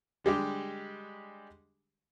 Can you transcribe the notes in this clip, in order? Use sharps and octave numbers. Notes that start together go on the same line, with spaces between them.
D3 G3 G#3 G4